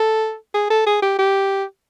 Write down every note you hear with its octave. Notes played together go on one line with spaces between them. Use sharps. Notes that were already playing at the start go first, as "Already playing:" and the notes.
Already playing: A4
G#4
A4
G#4
G4
G4